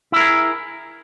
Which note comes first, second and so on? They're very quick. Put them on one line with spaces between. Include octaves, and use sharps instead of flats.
E4 A#4 G#4